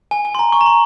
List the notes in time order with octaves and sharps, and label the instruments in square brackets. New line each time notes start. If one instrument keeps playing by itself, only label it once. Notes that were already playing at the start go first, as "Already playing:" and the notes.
[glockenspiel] G#5
G#5
C6
A#5
C#6
A#5
C6